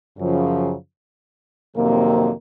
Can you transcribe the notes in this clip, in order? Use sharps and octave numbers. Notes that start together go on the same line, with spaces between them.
F#2 C#3 F3
F2 C3 D#3 F#3 A#3